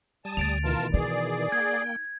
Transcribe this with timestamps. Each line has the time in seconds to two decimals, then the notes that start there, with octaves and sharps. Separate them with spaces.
0.25 G3 G#5 A5 D#6
0.37 D2 A6 D7 F7
0.64 B2 D#3 E3 F4 A#4 A5
0.94 D#4 G#4 D5
1.52 A#3 G5 G#6